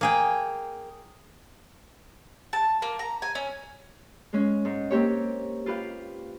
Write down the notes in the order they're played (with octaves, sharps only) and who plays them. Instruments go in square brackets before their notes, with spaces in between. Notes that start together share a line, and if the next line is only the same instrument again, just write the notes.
[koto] A#3 G#4 G5
[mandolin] A5
A#3
A#5
G#5
C#4
[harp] G#3 C#4
G#2
A#3 C4 G4 C#5
F4 G4 B4 F5